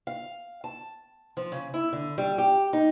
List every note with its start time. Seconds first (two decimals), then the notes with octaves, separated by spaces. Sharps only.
0.07 F5
0.64 A5
1.37 F3
1.52 C#3
1.74 E4
1.93 D3
2.18 G3
2.38 G4
2.73 D#4